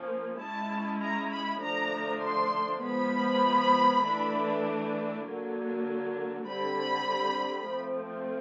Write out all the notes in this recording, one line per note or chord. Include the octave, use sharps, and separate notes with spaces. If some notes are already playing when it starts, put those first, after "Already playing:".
Already playing: F3 A#3 C#4
G#3 C#4 E4 A5
A#5
B5
D3 F3 A3 D4 A#5
C6
F3 G#3 B3 B5
E3 A3 D4
D3 F#3 A#3
D3 G3 C4 B5
F3 A3 C4